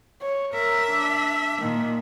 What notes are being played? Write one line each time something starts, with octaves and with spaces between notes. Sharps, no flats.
C#5
A#4 E5
D4
A#2 D#3